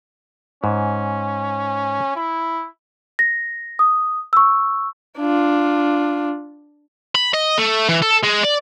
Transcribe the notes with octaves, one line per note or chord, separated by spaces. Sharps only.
G#2 C#4
E4
A#6
D#6
C#6 E6
D4 F4
B5
D#5
A3
E3
A4
G#3
D5